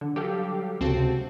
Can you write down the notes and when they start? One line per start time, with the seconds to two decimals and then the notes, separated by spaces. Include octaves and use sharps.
0.01 D3
0.16 F#3 G3 G4 A4 F5
0.81 C#2 C3 C4 F#4 A5